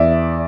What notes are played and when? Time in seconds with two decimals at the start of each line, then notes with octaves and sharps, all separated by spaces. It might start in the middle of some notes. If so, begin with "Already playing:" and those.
Already playing: E2 D5 E5